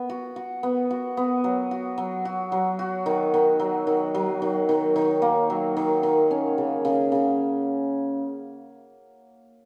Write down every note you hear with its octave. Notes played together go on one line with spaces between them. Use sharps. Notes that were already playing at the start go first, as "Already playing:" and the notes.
Already playing: B3
F#4
F#4
B3
F#4
B3
F#3
F#4
F#3
F#4
F#3
F#4
D#3
D#3
F#3
D#3
F#3
D#3
D#3
D#3
A#3
F#3
D#3
D#3
C#4
C#3
C#3
C#3